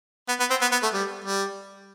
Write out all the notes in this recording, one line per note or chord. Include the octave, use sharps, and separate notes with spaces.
B3
B3
C4
B3
B3
A3
G3
G3